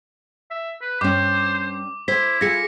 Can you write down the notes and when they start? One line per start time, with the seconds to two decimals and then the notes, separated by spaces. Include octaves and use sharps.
0.51 E5
0.81 B4
1.01 G2 C#4 C5 D6
2.08 E4 C5 B6
2.41 F4 G#4 A#6 C#7